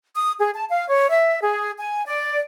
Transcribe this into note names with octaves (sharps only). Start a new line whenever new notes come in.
D#6
G#4
A5
F5
C#5
E5
G#4
G#5
D5